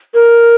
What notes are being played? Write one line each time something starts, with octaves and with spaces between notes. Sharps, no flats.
A#4